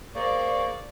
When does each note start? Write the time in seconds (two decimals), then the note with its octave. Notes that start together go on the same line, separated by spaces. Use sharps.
0.15 A#3 G#4 C5 D5 C#6